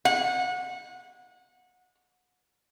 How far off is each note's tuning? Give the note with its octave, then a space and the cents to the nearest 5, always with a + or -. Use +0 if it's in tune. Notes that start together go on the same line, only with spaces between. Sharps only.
F#5 -25